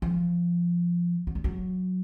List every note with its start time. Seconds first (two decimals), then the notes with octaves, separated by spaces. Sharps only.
0.02 F3
1.27 F#3
1.35 G3
1.44 F#3